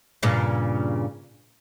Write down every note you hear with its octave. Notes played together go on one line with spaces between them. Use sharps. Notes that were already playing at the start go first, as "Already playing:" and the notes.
G2 A#2 C#3